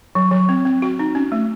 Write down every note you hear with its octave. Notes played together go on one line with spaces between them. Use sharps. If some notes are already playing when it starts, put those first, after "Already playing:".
F#3
F#3
C4
C4
F#4
D#4
C#4
A3